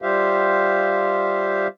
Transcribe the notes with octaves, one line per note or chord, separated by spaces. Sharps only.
G3 F4 G4 C5 E5 F5